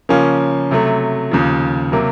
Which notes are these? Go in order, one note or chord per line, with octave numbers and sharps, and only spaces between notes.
C#3 F3 A#3 C#4
C3 F#3 A3
D#2 C#3 F3
C3 F#3 A#3